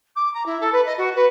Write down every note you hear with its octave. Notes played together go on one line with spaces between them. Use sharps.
D6
A#5
E4
A4
B4
D#5
F#4
B4